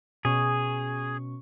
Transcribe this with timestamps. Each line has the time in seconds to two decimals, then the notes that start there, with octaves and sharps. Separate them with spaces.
0.25 B2 C#4 G#4 C#6